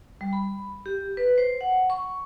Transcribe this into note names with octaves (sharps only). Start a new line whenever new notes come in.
G3
B5
G4
B4
C5
F#5
C#6